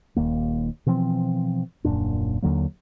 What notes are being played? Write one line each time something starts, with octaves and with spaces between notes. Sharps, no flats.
D#1 D#2 A#3
B2 E3 F3 C4
D#1 F#2 A#2 D4
D#2 D3 F#3 A#3